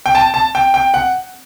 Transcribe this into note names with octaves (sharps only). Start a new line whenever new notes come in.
G5
A5
A5
G5
G5
F#5